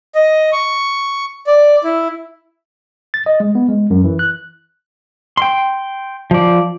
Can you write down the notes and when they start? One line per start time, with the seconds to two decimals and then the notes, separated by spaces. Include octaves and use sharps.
0.15 D#5
0.53 C#6
1.47 D5
1.84 E4
3.14 A6
3.26 D#5
3.40 G#3
3.55 B3
3.69 G#3
3.90 F#2
4.05 E3
4.19 F#6
5.37 G5 C6
6.31 F3 D5